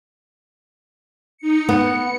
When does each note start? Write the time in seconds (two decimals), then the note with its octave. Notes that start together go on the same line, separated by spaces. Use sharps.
1.38 D#4 C#7
1.69 B3 C#7